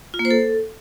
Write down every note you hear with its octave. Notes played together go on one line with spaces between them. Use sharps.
F4
A#3
C5
A4